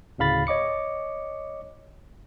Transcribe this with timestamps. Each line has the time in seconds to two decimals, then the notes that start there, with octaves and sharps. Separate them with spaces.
0.18 D2 A2 C#3 F5 B5 A6
0.47 C#5 D#5 D6 C#7